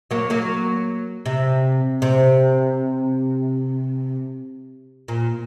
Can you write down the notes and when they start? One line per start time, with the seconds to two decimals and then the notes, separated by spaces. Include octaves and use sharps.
0.11 F#3 A#3
0.30 F#3 A#3
1.26 C3
2.02 C3
5.08 A#2